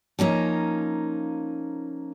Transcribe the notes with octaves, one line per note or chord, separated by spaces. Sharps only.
F3 A#3 C#4 D#4